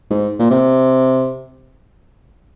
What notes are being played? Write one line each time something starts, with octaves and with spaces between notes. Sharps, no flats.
G#2
A#2
C3